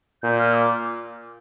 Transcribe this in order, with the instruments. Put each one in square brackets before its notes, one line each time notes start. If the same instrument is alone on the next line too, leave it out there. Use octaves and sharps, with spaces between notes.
[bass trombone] A#2 [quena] G6
[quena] F6
D6